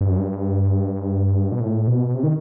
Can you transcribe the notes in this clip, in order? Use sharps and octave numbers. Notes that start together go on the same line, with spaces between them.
G2
F#2
G2
B2
A2
B2
C3
D#3